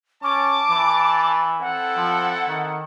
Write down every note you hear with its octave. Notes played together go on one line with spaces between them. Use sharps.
C#4 A5 D6
E3
C4 E4 A4 F#5
F3
D#3